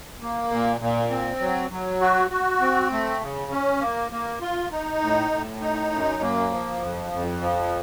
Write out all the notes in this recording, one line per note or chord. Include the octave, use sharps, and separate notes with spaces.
A#3
A#2
A#2
C4
F#3
F#3
F#4
F#4
C4
A3
C#3
C#4
A#3
A#3
F4
D#4
A2
A2
D#4
F#2
A#3
F3
F2
F2
F3